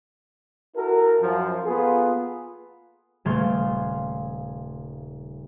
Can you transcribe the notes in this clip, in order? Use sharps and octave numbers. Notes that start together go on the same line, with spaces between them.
E4 F#4 A4 A#4
F#2 F3
A#3 B3 F4 G#4 A4
D#1 C#3 A3 F5 C6 G#6